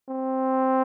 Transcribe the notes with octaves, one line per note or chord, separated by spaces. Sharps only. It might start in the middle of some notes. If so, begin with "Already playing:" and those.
C4